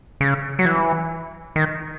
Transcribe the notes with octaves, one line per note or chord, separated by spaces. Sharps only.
C#3
F#3
E3
D#3